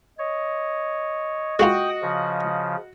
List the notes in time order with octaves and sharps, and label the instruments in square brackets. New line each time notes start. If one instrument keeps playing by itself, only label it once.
[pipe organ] C#5 [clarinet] D#5
[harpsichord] G#3 A#3 F4 [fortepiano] F#4 [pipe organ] G5 D#6
[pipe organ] C#3 F3